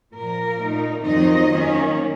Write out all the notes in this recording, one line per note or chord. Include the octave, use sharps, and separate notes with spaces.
A#2 F3 A#3 A#4
A#2 A3 D#4
F2 D#3 F#3 C4 D#4 D#5
D#3 A#3 C#4